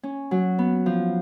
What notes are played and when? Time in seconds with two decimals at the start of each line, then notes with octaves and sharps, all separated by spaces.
0.03 C#4
0.31 F#3
0.59 B3
0.86 F3